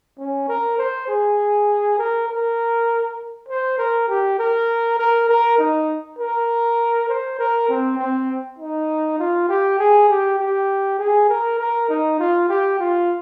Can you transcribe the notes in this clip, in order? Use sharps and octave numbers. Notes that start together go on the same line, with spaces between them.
C#4
A#4
C5
G#4
A#4
A#4
C5
A#4
G4
A#4
A#4
A#4
D#4
A#4
C5
A#4
C4
C4
D#4
F4
G4
G#4
G4
G4
G#4
A#4
A#4
D#4
F4
G4
F4